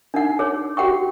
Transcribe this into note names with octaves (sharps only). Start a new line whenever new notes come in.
D4 D#4 F#5
G#4 C#5
F#4 G4 F#5 G5 C#6